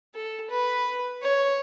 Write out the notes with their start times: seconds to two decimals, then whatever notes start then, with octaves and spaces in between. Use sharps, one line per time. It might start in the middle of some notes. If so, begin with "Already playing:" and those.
0.14 A4
0.50 B4
1.22 C#5